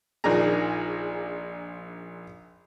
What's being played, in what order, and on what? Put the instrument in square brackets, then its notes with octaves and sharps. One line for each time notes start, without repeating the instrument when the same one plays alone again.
[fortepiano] A#1 D#3 D4 F4 G#4 A#5